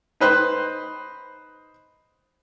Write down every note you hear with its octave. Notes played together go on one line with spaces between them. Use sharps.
D#4 B4 C5 F#6